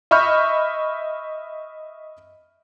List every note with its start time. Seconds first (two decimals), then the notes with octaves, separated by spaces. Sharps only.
0.11 D#5 E5 B5 C#6 F6 G6